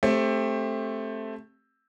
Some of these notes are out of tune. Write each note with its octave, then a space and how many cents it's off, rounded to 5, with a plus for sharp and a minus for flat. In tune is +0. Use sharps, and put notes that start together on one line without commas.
A3 +0 C4 +15 G4 +15